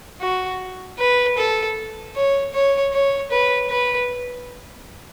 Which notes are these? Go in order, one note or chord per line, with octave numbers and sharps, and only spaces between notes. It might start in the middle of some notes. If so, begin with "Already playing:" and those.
F#4
B4
A4
C#5
C#5
C#5
B4
B4